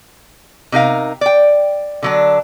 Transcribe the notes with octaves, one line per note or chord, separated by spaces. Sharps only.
C3 D#4 A#4 F5
D5 G5
D3 F#3 D4